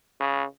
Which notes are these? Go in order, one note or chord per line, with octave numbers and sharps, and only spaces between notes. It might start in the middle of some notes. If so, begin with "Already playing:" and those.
C#3